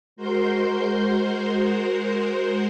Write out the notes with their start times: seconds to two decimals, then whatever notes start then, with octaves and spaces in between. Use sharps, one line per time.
0.16 G#3 F#4 A#4 C5 C6 G6